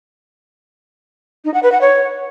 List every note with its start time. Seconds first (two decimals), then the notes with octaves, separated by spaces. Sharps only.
1.45 D#4
1.54 F#5
1.63 B4
1.72 F#5
1.81 C#5